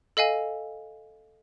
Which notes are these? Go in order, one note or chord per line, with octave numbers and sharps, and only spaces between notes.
A4 D#5 F5 G#5